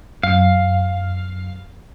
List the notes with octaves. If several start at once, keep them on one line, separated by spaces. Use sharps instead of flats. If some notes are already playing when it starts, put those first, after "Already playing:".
F#2 F5